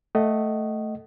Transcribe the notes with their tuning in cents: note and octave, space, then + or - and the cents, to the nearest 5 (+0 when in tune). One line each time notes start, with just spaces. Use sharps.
A3 +0 D#5 +0 F#5 +35